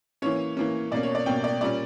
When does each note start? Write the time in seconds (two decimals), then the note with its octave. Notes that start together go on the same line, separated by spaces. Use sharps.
0.22 E3 A#3 C#4 C#5
0.57 E3 A#3 C#4
0.92 B2 A#3 C#4 D5
1.03 C#5
1.15 D5
1.26 B2 A#3 C#4 G5
1.44 D5
1.61 A#2 G3 C#4 D5